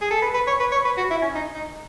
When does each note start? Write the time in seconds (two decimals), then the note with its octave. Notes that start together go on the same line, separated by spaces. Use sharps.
0.01 G#4
0.10 A4
0.22 B4
0.34 B4
0.47 C#5
0.60 B4
0.72 C#5
0.85 B4
0.97 F#4
1.10 E4
1.22 C#4
1.35 D#4
1.55 D#4